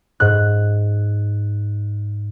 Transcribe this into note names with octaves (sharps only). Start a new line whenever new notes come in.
G#2 F#6